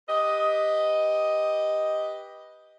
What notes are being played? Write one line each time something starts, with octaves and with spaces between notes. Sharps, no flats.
G4 B4 D#5